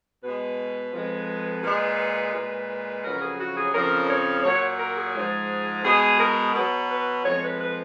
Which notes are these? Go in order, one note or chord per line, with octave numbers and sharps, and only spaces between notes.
B2 G#3 B4
F2 F3 G#3
A#2 G#3
A#2 G#3
F2 C#3 F#3 A#4
G#4
F#4
G#4
F2 C#3 F3 A#4
C#5
A#2 F#3 C#5
A#4
G#4
G#2 F3 G#3
B2 G#3 G#4
A#4
B2 F#3 B4
B4
F2 F3 G#3 C#5
B4
B4